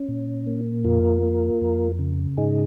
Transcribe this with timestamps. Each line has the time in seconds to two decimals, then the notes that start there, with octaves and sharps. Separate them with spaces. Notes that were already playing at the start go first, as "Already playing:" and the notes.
Already playing: C#4
0.08 A#2
0.47 A#3
0.84 F2 F4 A#4
1.23 A#3
1.61 F2
1.99 C#3
2.37 G#2 D#4 G#4